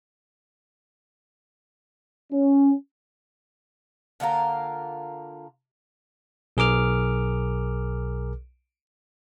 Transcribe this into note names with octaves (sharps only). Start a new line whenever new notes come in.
C#4
D3 A#3 F4 A#4
B1 G#4 A#4 D6 F6